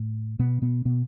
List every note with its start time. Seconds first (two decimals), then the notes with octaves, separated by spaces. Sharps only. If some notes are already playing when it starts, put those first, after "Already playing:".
Already playing: A2 A3
0.39 B2 B3
0.62 B2 B3
0.85 B2 B3